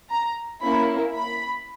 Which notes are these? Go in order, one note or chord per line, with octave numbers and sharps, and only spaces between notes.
A#5
A#3 C#4 E4 B5
B5